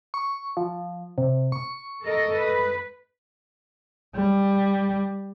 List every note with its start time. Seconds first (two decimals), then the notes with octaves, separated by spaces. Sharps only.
0.14 C#6
0.57 F3
1.18 C3
1.52 C#6
2.03 A4 A#4 D#5
2.37 B4
4.16 G3